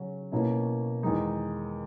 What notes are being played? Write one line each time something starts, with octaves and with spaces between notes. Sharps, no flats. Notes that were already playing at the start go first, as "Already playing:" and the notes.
Already playing: C#3 F#3 C#4
B2 A#3 C#4 E4
E2 D#3 G#3 D#4